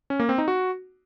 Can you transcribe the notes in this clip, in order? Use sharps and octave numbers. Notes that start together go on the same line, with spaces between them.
C#4
A#3
C4
D#4
F#4